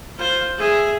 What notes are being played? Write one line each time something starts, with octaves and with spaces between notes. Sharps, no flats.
F4 C5
G#4 E5